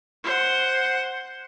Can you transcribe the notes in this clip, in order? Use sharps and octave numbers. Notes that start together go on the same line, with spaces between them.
C5 F#5